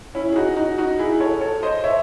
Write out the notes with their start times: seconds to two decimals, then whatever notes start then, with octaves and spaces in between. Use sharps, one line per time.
0.15 C#4 E4
0.32 G#4
0.36 D#4 F#4
0.57 D#4 F#4
0.78 D#4 F#4
0.99 E4 G#4
1.20 A4 C#5
1.41 A4 C#5
1.63 C5 D#5
1.84 C#5 E5